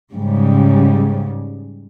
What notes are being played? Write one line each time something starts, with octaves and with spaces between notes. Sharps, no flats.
G#2 C#3 G3